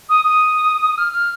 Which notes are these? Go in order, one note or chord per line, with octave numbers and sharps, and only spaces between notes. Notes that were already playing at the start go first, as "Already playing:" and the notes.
D#6
D#6
F6
F6